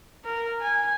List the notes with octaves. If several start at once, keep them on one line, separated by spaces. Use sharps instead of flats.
A#4
G#5